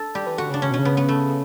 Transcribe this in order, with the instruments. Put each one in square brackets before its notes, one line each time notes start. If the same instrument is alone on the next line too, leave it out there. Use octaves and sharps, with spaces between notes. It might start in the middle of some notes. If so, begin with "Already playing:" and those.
Already playing: [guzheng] D4 A4
[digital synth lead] G3 [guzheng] G4
[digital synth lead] E3
[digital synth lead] D3 [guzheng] F#4
[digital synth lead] C#3
[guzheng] D4
[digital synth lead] C#3 [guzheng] C#4
[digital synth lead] B2
[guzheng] C#4
[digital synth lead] C#3
[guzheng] B3
B3
A3